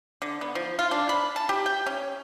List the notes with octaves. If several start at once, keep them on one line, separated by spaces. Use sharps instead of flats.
D3
B3
F3
F4
D4
B5
A5
G4
G5
C#4